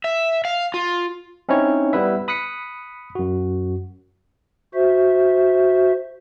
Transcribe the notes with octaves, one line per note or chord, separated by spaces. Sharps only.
E5
F5
F4
C4 C#4 D#4 E4 C#5
G3 B3 E4 B4 E5
B5 D#6 F#6 B6 C#7
F#2 F#4
F#4 C5 E5